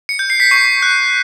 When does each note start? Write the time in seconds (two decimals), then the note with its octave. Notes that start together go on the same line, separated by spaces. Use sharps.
0.09 C#7
0.19 G6
0.30 C7
0.40 B6
0.51 C#6 C7
0.82 F#6